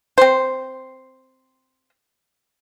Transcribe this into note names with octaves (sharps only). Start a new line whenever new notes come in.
C4 C5